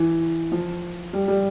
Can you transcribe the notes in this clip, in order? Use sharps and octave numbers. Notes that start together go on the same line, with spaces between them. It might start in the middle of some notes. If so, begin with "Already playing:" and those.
Already playing: E3
F3
G3
G3